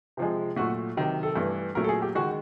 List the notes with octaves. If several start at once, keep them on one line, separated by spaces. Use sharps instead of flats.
C3 F3 G#3
A#2 F#3 A3 F#4
C3 D#3 F#3
A4
G2 E3 A3
A#2 F#3 A3 A#4
A4
G#4
G4
D#3 G#3 F#4